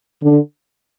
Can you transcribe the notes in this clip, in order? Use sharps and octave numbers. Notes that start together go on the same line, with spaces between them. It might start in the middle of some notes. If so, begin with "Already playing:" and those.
D3